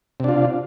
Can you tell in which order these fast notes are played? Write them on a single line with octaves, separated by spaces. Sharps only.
C3 D4 F4